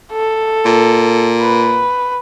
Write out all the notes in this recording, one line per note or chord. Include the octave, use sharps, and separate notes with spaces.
A4
A#2
B4